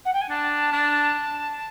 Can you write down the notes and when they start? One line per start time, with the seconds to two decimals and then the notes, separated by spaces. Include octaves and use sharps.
0.05 F#5
0.13 G5
0.21 G#5
0.29 D4 A5
0.72 D4